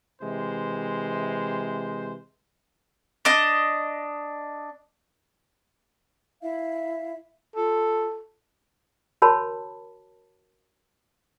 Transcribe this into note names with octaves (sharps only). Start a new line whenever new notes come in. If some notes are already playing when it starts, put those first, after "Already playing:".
C3 E3 G#3 C5
D4 D#5
E4 E5 F5
F4 A4
F#4 A#4 C#5 A5 B5